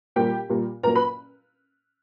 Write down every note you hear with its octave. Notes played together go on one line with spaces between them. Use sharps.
A#2 G3 A#3 G4 G5
A#2 G3 A#3
A#2 F#3 A#3 A#4 A#5
B4 B5